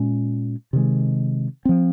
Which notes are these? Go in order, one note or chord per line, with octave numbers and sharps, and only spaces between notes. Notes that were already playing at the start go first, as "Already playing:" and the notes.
Already playing: A#2 G#3 C#4
C3 D#3 G#3
F3 C4